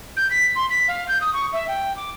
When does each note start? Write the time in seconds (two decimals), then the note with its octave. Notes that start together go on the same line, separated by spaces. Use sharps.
0.16 G6
0.30 B6
0.55 C6
0.70 B6
0.88 F5
1.08 G6
1.21 D#6
1.33 C#6
1.53 E5
1.68 G5
1.96 D6